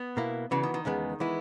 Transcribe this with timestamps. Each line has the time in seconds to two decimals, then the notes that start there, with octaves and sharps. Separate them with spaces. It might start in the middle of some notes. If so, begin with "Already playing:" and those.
Already playing: B3
0.17 B2 A#3 E4
0.51 C#3 E3 B3 F#4
0.63 D#3
0.74 D#3
0.85 E2 C#3 G#3 B3
1.20 E3 G#3 B3 E4